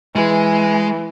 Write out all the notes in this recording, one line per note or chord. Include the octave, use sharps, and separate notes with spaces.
E3 G#3